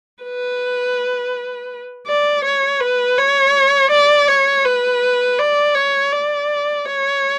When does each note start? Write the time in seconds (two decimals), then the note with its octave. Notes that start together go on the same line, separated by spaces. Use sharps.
0.23 B4
2.07 D5
2.44 C#5
2.80 B4
3.18 C#5
3.91 D5
4.28 C#5
4.65 B4
5.39 D5
5.75 C#5
6.12 D5
6.86 C#5